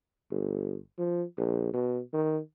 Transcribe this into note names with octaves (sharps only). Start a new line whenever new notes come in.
G1
F3
A#1
B2
D#3